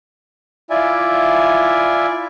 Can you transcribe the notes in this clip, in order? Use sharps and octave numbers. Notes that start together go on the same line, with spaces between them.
E4 F4 D5 E5 G#5